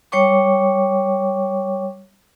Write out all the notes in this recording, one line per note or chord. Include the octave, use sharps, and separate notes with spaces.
G3 C#5 G5 C#6 D6